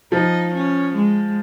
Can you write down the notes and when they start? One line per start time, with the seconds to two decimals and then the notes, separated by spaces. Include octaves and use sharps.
0.12 F3 D#4
0.53 C#4
0.94 G#3